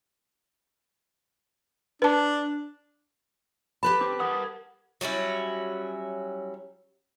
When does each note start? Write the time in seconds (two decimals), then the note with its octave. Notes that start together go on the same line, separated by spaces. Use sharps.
2.02 D4 B4 A5
3.83 G4 B4 A5 B5
4.01 C4 D6
4.20 A#4 F#5 D#6
5.01 F#3 G3 C#4 E4